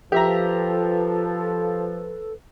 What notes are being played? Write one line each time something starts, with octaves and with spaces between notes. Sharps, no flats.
F3 G4 A4 B4 E5 A#5